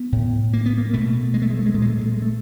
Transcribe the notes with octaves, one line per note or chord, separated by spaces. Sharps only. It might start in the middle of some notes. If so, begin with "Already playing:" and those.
Already playing: B3
A2
A#3
B3
A#3
B2 A3
G#3
A3
G#3
A3
G#3
A#2 A3
G#3
A3
G#3
A3
G#3
A3